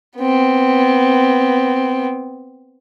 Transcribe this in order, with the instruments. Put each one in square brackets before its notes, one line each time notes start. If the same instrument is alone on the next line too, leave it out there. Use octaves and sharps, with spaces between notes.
[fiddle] B3 C4